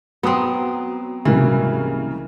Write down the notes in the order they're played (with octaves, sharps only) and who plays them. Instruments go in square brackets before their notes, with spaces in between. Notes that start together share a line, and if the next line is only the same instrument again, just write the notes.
[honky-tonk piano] F#3 D#6 [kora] B3 C4
[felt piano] C2 G#2 F#3 [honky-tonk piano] C#3 A#3 [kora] E3